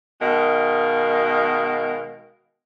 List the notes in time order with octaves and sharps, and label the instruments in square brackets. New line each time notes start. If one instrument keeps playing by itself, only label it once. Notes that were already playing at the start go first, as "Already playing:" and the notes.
[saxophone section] B2 D#3 G#3 A#4 F5